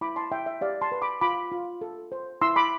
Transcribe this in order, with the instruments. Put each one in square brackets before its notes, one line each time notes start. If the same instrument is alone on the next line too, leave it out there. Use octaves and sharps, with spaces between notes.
[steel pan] E4 B5 D6
A5 C6
E4 E5 G5
E5
G4 D5 F5
A5 C6
B4
B5 D6
F4 B5 D6
F4
A4
C5
E4 C6 E6
B5 D6